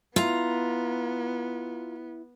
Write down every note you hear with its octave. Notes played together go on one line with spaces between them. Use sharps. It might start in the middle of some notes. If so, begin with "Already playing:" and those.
B3 E4 F4 A#5